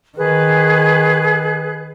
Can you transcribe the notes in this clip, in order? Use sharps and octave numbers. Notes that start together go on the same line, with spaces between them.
D#3 G#4 B4 F#6